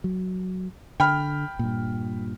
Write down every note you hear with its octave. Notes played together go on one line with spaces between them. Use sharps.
F#3
D3 G5 B5 F6
G2 A#2